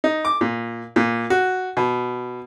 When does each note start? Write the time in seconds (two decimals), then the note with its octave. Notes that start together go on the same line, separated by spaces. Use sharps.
0.04 D#4
0.25 D6
0.41 A#2
0.96 A#2
1.30 F#4
1.77 B2